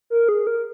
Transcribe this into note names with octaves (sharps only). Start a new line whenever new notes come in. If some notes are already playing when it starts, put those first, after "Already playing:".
A#4
G#4
A#4